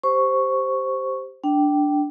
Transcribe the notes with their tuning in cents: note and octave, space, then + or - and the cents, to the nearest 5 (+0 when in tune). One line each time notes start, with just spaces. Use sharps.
G4 +0 C5 +0 C#6 +0
D4 +0 G5 -15